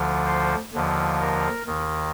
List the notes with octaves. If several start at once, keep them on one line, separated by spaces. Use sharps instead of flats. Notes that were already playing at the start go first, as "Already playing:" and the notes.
Already playing: D2 D3 F3
C5
D#2 D3 F3
A#4
D#2 D#3